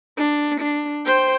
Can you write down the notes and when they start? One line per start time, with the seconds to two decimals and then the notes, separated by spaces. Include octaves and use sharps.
0.17 D4
0.61 D4
1.06 C5 G5